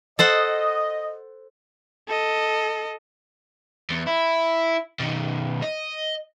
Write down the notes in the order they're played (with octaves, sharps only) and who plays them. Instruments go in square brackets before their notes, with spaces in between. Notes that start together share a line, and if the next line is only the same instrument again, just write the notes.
[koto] A4 C5 F#5 [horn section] D#5
[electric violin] A4 D#5
[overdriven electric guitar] E2
E4
B2 D#3
D#5